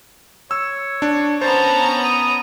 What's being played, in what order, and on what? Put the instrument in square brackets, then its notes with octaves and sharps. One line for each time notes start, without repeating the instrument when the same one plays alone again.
[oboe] C#5 [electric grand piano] E6
[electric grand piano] D4
[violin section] B3 C#4 A#5 [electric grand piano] C5 [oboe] A5
[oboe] D#6